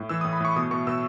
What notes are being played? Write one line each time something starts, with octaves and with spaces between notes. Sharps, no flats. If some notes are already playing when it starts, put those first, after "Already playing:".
Already playing: A2
E3 E6
D#6
A2
B5
A2 C#6
B2 D#6
B2 C#6
B2 E6